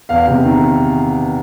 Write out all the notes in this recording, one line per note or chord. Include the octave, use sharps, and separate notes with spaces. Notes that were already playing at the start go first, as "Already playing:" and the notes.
E2 F5
C3
D#3